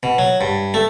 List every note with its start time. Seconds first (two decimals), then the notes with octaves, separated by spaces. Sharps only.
0.03 B2
0.19 F#3
0.41 G2
0.74 A3